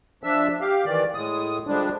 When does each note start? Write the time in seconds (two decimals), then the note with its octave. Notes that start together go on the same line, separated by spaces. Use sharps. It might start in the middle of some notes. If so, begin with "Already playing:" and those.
0.24 F3 D4 E5 E6
0.61 G4 F5
0.85 D#3 E3 D5
1.15 A2 G#3 D#6
1.67 D3 F3 G3 G#3 D4